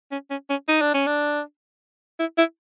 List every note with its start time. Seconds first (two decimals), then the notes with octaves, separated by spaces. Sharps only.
0.12 C#4
0.30 C#4
0.50 C#4
0.68 D#4
0.82 D4
0.94 C#4
1.06 D4
2.19 E4
2.38 E4